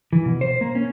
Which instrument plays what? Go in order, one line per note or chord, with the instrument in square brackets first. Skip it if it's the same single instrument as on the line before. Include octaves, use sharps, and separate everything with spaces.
[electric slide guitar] E3
B2
C5
A#3
C#4